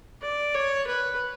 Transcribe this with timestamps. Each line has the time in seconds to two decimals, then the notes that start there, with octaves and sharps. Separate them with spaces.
0.22 D5
0.54 C#5
0.87 B4